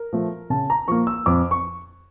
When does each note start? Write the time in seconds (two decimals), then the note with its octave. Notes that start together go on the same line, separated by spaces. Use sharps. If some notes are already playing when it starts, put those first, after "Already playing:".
Already playing: A#4
0.13 F3 A3
0.50 C#3 A5
0.70 A#5
0.88 F3 A#3 C#6
1.07 E6
1.26 F2 D6
1.51 C#6